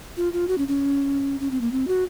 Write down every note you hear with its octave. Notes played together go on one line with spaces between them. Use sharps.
F4
F4
F#4
C#4
C#4
C#4
C4
A#3
C4
F#4